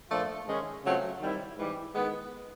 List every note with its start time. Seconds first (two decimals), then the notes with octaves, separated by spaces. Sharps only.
0.09 A#2 F3 A3 D4 F4
0.47 G#2 D#3 G#3 C#4
0.84 C#3 F#3 A3 C4 F4
1.20 D#3 G3 C4 E4
1.57 G#2 E3 G3
1.94 D#3 G#3 B3